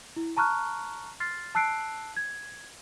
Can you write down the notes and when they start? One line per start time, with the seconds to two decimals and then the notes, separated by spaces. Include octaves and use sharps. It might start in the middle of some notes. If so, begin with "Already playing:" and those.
0.16 E4
0.37 A5 A#5 C#6 F6 F#6
1.20 C6 F6 A6 C7
1.55 A5 E6 F#6 C7 D7
2.17 G#6